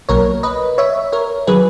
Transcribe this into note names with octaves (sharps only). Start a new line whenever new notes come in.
B1 B2 F#3 A#3 A#4 C#5
B4 D#5
C#5 E5
A#4 C#5
D#3 F#3 G#4 B4